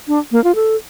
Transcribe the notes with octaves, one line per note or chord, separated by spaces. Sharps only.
D4
A#3
F4
A4